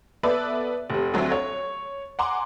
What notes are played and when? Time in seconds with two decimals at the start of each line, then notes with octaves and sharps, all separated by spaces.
0.23 B3 A4 B4 D5 E5
0.90 F1 C3
1.14 D2 F#3 C4 A4 E5
1.32 C#5
2.19 F#5 G#5 A#5 C6 D6